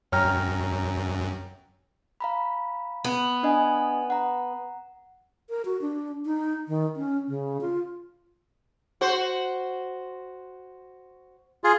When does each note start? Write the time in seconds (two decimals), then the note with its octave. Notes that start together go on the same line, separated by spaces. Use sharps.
0.12 F#2 C#5 G5 A#5 F6
2.20 F5 A#5 B5
3.05 B3
3.43 D4 D#5 G#5
4.10 F#5 A#5
5.50 A#4
5.65 F#4
5.81 D4
6.25 D#4
6.68 D#3
6.96 C#4
7.28 C#3
7.61 F4
9.01 F#4 C5
11.64 F4 G#4